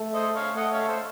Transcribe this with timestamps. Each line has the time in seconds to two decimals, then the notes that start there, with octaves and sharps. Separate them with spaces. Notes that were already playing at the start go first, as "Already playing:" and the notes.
Already playing: A3
0.14 C5 D#5
0.36 C#5 F5
0.56 A3 D#5 F#5
0.72 C#5 F5
0.88 A4 C5